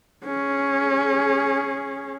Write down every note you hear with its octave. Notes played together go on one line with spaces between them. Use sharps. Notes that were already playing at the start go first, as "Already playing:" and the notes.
C#4 G#4